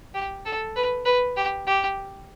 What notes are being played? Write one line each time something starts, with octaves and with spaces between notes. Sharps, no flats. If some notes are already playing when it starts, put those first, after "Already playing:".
G4
A4
B4
B4
G4
G4